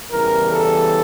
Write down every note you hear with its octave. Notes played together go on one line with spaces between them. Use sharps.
E2 C#3 E3 G3 A#4
A4